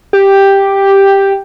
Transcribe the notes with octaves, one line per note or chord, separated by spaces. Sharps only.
G4